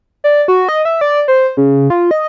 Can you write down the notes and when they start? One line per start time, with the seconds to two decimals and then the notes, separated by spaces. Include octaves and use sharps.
0.24 D5
0.48 F#4
0.69 D#5
0.85 E5
1.01 D5
1.28 C5
1.57 C#3
1.90 F4
2.11 D#5